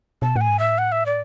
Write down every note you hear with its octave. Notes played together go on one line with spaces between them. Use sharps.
B2 A5
A2 F#5
G#5
G#2
A2 E5
F#5
E5
D5